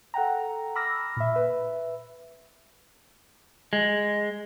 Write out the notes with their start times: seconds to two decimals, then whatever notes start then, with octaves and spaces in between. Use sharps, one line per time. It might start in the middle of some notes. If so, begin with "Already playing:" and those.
0.14 A4 F#5 G5 A#5
0.75 B5 D6 E6 F6 A#6
1.17 A#2 E5
1.35 B4 E5
3.73 G#3